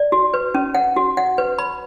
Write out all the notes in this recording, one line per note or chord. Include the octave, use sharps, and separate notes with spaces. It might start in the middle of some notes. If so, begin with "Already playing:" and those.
Already playing: D5
F#4
B4
C#4
F#5
F#4
F#5
B4
B5